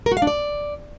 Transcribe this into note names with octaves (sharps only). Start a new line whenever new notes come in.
A#4
F#4
F5
D4
D5